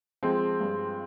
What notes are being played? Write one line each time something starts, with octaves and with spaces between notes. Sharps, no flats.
F3 G#3 C4
G2